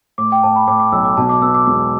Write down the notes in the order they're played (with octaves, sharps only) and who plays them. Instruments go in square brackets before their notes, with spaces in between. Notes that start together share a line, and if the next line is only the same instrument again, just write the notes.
[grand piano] A2 [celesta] D6
[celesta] G5
[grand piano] A2 [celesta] A5
[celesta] B5
[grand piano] A2 [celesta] D6
[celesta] D6
[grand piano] B1 [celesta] E6
[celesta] D6
[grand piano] B2 [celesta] A5
[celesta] D6
[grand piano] B3 [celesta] E6
[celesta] D6
[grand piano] E1 [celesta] D6